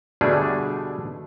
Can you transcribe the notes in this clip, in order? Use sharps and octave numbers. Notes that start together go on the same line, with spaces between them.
B2 D3 G3 A3 D4 G#4